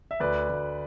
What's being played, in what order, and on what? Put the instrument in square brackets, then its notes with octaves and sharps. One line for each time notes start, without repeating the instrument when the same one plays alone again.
[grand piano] E5
D2 B4 D5
D2